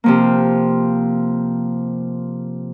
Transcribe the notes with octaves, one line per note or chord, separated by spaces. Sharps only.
C3 F3 A#3